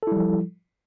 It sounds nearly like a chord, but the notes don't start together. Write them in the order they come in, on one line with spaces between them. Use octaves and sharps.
A4 E4 G3 F3